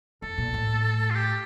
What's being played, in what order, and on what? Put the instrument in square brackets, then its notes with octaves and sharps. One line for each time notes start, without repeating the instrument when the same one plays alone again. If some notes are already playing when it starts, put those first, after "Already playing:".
[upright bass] F2 [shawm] A4
[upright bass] A#2
A2
[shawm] F4
G4